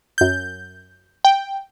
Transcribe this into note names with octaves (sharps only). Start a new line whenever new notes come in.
F#2 G6
G5